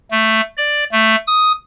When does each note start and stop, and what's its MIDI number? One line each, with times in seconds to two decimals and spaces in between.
0.11 0.41 57
0.57 0.84 74
0.92 1.15 57
1.27 1.52 87